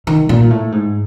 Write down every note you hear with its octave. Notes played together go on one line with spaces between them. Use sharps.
D#3
A#2
A2
G#2